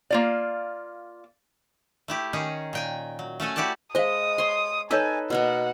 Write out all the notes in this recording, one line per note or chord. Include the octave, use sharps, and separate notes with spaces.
A#3 F4 D5
A3 E4 G4
D#3 C#4 D#4 G#4
A#2 G5 G#5
F#3
A3 C#4 A4 G#5
E4 F#4 G4 A4 D5 A5
G#3 C5 D#5 F5 D#6
C#5 C6
D#4 A4 B4 C#5 G#5 E6
B2 A#3 B3 F#5